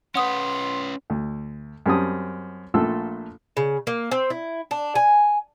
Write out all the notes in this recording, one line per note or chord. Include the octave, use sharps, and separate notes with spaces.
C#4 B4 F#5 C6 D#6
D2
F#2 G3 C4 A5 D#6
A#1 A#2 A3 F4 A4 E6
C#3
A#3
C4
E4
D4
G#5